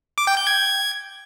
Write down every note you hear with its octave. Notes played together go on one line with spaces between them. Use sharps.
D6
G5
G6
G#6